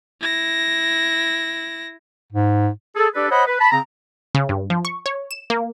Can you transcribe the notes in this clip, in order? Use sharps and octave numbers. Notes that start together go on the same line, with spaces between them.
E4 A#6
G#2
G#4 A4
D4 G4 A4 B4 D5
C5 C#5 D#5 F#5 B5
B4
A5 B5
C#3 C4 A#5
C#3
G2
F3
C#6
C#5
E7
A#3